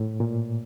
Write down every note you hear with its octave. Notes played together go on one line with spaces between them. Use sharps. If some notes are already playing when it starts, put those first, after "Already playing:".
Already playing: A2
A#2